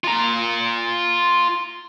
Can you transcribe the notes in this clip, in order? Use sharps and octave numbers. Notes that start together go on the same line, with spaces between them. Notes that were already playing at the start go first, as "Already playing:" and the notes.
F4 A#5